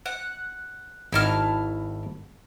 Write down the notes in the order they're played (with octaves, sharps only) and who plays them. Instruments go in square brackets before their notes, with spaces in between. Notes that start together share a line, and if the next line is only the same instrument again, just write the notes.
[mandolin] F#5
[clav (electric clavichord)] G#1 D#4 F#4 [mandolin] E4 A5 F6